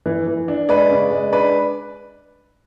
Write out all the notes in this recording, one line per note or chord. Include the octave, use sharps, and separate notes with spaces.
E3
E3
D4
G#3 B4 D5
C#3
G#3
D4 B4 D5